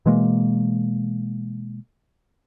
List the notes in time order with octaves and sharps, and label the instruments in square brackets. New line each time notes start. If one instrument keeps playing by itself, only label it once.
[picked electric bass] B2 E3 G#3 A#3